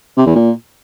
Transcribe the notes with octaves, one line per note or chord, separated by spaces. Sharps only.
C3
E2
A#2